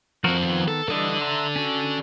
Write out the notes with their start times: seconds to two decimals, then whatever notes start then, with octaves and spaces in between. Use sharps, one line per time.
0.24 F3 C4 F#4 A#4 F#5
0.43 D#3 B3
0.68 A4
0.88 E3 G3 A4 D5 D#5
1.21 E5 A#5 C6
1.56 C#4 F#4